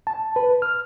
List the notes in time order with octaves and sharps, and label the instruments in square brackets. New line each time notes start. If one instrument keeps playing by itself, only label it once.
[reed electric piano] A5
B4
F6